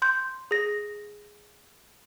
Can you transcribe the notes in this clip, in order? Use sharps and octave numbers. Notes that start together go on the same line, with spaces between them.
C6 G6
G#4 A#6